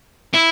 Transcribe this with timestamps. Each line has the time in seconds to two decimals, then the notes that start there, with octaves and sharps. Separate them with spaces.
0.34 E4